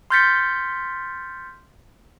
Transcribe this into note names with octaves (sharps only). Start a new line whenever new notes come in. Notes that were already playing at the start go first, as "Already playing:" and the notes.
C6 F6 G6 A6 B6 C#7